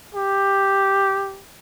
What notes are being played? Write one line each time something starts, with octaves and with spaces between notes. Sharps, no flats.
G4